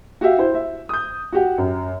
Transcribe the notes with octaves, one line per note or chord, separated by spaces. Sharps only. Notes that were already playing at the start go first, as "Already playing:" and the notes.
F#4 G4 E5 F5
E4 C5
E5
D#6 G6
F#4 G4 F#5
F#2